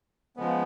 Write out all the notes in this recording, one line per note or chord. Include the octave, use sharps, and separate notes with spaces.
C#3 F3 G#3 B3